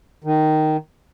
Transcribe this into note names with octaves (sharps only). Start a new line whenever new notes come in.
D#3